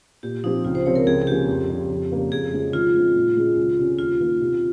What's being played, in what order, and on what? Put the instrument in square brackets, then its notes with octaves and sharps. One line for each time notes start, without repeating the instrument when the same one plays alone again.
[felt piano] A#2 [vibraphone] G4
[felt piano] F3 C4 G4 [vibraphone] D#4
[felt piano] C#2 [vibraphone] F4
[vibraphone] C5
[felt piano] C3 F3 C4 [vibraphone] C#5
[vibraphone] A#4
[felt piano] C#2 [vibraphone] G#4
[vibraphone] G#4
[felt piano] C3 F3 A#3 C#4 [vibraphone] G4
[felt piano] F2
C#3 G3
F2
C#3 G3 A#3
[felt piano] F2 [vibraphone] G#4
[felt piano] C#3 F3 G#3 C4
[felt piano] D#3 [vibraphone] F4
[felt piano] G#3 C4
A#2
G#3 C#4 G#4
C#2
C3 G3 C#4 G#4
[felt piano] D#2 [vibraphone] F4
[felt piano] D#3 A#3
C3